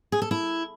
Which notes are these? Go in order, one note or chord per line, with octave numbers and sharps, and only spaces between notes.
G#4
A4
E4